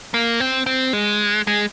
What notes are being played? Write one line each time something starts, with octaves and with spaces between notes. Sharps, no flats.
A#3
C4
C4
G#3
G#3